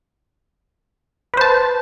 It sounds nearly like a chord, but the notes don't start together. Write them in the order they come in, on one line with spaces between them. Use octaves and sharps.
B4 C5 A5